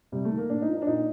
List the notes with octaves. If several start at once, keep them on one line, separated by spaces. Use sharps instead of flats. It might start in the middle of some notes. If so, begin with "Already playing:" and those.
C3 G3
A3
D#3
A#3
A2 D4
D#4
F3
D#4
D4
A#2 D#4